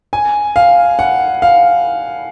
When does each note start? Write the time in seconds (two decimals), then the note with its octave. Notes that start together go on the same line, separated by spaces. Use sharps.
0.13 G#5
0.56 F5
0.99 F#5
1.42 F5